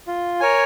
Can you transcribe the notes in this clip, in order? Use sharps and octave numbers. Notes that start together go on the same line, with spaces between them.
F4
A#4 C#5 G#5